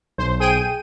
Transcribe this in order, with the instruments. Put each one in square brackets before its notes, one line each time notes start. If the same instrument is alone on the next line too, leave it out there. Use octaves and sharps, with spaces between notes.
[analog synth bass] B1 [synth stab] C5
[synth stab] G#4 G5 D#7